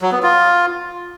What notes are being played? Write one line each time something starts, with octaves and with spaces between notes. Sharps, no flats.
F#3
B3
F4